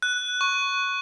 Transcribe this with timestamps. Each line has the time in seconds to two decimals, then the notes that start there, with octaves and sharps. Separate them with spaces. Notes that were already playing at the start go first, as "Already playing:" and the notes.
0.02 F#6
0.41 C#6